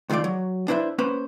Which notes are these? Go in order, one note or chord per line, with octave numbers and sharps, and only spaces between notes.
C#2 D#3 A3 F4 D5
F#3
D4 E4 B4 C5 E5
A#3 C#4 B4 C5